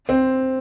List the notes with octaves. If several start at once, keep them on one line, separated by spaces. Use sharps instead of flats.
C4